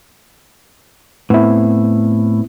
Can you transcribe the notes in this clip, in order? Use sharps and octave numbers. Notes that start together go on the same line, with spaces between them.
A2 B3 C4 E4